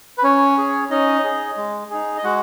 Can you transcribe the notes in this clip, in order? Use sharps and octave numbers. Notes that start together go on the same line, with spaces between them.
B4
C#4 C#5
G#4
C#4 D#4 D#5
G#4
G#3
D#4 G#4
D#5
G#3 F#4 F#5